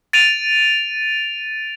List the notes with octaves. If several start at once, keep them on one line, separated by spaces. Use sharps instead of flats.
A6 D7 D#7 F7